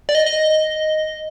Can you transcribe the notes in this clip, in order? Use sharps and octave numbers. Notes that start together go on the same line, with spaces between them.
D5
D#5
D#5